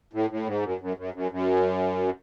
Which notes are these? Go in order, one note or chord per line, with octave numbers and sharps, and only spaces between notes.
A2
A2
G#2
F#2
F#2
F#2
F#2
F#2